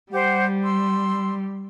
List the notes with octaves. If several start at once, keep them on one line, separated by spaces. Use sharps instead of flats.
G3 G4 C5 F#5
C6 E6